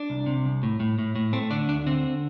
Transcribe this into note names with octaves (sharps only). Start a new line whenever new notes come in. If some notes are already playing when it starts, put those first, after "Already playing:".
Already playing: D4
C2
C3
C2
A2
A2
A2
A2
A3 C4
D3 D4
D2 D4
D3 C4